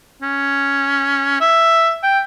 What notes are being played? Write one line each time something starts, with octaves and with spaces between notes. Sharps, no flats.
C#4
E5
G5